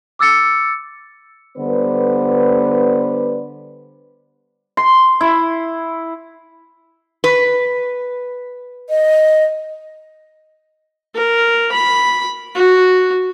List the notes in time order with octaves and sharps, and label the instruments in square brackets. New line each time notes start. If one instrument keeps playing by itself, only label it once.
[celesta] D6 E6 A6 C#7
[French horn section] D3 G3 B3 B4 C5 D5
[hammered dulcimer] C6
E4
[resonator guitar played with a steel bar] B4
[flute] D#5
[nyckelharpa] A#4
B5
F#4